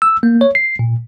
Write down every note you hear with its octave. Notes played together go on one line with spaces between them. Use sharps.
E6
A#3
C#5
C7
A#2